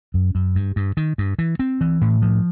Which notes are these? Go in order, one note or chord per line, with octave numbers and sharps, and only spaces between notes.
F#2
F#2
G2
G2
D#3
G2
E3
C4
E3
A2
F3